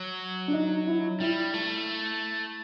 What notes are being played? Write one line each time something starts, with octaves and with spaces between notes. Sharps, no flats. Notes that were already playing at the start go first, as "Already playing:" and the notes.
Already playing: F#3
D4
D#4
E4
G3 E4
A3